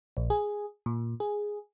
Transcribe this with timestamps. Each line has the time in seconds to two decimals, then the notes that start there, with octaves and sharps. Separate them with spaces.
0.17 A#1
0.30 G#4
0.86 A#2
1.20 G#4